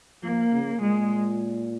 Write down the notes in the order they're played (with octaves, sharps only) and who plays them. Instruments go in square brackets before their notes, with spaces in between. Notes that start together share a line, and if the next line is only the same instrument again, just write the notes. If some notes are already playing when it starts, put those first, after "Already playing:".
[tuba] F3 [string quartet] A#3
[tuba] C#3
[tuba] A#2 [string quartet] G#3